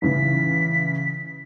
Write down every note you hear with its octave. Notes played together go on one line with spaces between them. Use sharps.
A1 C#3 E3 B6